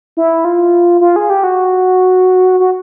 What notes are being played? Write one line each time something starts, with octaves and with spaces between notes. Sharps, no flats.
E4
F4
F4
G#4
G4
F#4
F#4